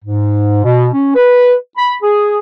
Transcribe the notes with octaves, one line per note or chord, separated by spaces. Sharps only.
G#2
B2
C#4
B4
B5
G#4